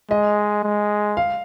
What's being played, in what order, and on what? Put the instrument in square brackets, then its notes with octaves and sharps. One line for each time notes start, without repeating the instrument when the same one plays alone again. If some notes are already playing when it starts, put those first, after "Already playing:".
[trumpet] G#3 [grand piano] D#5
[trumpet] G#3
[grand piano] F5